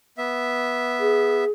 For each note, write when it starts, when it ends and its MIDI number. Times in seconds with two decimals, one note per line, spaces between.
0.18 1.44 59
0.18 1.44 76
1.00 1.50 68